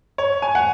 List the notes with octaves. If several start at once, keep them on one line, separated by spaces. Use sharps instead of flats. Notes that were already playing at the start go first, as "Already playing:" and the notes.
C#5
G#5
F#5